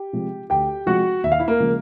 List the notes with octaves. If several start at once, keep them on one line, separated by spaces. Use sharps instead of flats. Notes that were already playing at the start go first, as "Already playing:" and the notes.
Already playing: G4
C3 F3 G#3
D2 G4 G5
C3 F3 G#3 F#4 F#5
D#2 E5
F5
E4 E5
A#3 A#4
C#3 F3 G#3